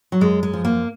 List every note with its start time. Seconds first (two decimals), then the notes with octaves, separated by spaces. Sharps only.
0.12 F#3
0.21 F#2 G#3
0.43 G#3
0.53 F3
0.65 A#3